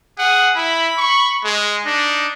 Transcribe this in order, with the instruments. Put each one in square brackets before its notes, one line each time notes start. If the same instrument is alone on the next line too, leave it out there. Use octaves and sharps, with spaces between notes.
[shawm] G#4 [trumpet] F#5
[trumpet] E4 [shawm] B5
[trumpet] C#6
G#3
[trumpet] D4 [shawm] D#4